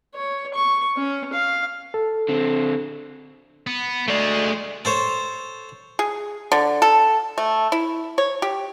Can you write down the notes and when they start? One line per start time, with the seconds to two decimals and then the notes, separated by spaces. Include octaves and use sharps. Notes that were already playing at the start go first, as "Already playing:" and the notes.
0.14 C#5
0.54 C#6
0.97 C#4
1.33 F5
1.94 A4
2.29 D3 C4
3.67 B3
4.08 G#3 A3 D5
4.85 A4 C5 C#5
5.99 G#4
6.52 D3
6.82 A4
7.38 A3
7.72 E4
8.18 C#5
8.42 G4